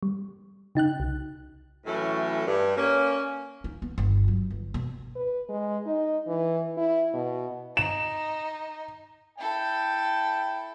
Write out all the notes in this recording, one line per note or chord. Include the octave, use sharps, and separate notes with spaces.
G3
C#3 D#4 G5 F#6
C2
A2 E3 F#3 A3 C#4
G2
A#3 C#4
D#4
B3
G1
F#3
G1
B2
B4
G#3
D#4
E3
E4
B2
D#4 E7
E4 A4 G5